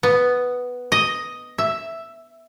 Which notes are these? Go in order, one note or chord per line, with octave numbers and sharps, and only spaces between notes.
B3
D#5
E5